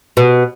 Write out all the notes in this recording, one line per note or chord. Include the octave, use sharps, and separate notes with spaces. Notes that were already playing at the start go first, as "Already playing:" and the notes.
B2